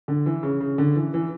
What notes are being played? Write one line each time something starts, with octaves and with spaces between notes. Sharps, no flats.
D3
E3
C#3
C#3
D3
E3
E3